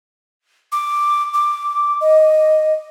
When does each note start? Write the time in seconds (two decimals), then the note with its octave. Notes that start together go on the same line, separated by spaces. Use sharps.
0.72 D6
1.34 D6
2.01 D#5